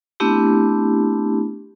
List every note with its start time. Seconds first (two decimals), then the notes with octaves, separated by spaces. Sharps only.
0.20 A3 B3 C4 D4 E4 G4